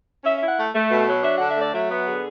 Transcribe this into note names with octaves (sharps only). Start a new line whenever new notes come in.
C#4 E5
E5
E4
F#5
A3
A3
B2
F#3
D4 E5
D3 F#5
E5
A3 D5
F#3 E5
B3 E5
D3 G#4